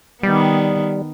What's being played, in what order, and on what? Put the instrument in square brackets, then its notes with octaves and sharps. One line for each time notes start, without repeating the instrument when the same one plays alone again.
[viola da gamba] D#3 B3 [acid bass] G3